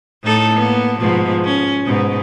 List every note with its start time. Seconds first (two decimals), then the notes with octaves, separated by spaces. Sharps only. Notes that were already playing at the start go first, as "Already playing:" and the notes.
0.23 A2 D#4 A4
0.54 A#3 B3
0.99 G#2 B2 F3
1.44 C#4
1.85 G#2 B2